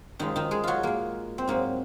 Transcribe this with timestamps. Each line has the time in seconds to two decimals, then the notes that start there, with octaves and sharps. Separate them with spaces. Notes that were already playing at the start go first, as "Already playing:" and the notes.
0.19 F#2 D#3 F3 G#3 D#4
0.36 D#3 D#4
0.51 G#3 G#4
0.64 F#3 F4 F#4
0.83 A#2 G#3 A#3
1.38 C4
1.47 G#2 F#3 A#3